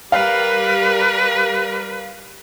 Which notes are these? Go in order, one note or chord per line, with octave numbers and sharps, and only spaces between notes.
G3 A#4 B4 F5